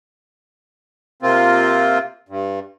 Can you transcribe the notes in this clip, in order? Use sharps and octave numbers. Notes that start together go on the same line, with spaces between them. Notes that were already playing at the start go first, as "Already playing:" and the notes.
C3 A#3 C4 F4
G2